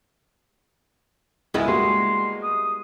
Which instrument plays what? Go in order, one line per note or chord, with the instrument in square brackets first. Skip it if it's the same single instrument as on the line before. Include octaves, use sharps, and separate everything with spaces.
[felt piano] C#2 G#5 [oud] G#3 B3 E4
[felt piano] G3 A#3 F#4 [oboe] C6
[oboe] D#6